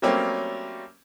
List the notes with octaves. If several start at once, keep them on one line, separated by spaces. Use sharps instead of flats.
F#3 G3 A3 A#3 C4 C#4